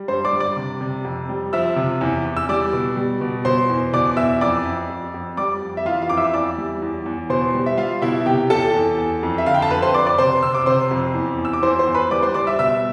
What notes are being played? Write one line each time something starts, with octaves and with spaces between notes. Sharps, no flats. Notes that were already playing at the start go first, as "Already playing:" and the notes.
Already playing: G3
G2 C5 C6
D5 D6
G3
D5 D6
C3
C3
F2
G3
F3 E5 E6
C3
E2
E2
E6
G3 D5 D6
B2
G3
B2
B2 C5 C6
E2
B2 D5 D6
E2 E5 E6
F2 D5 D6
F2
F2
F2
G3 D5 D6
F2
E5
E3 F4 F5
F4 F5
F2 D6
E5 E6
E2 D5 D6
G3
E2
E2
B2 C5 C6
G3
E5
G3 F4 F5
B2 E4 E5
C3 G4 G5
E2 A4 A5
E2
E2
F2
E5
D3 F5
G5
A5
F2 B4 B5
C5 C6
F2 D5 D6
D5 D6
C3 C5 C6
C3 E6
D6
C3 C5 C6
F2
E2
E2
E6
D6
E2 C5 C6
C5 C6
E2
B4 B5
G3 D5 D6
C5 C6
G3 D5 D6
E5 E6
B2 E5 E6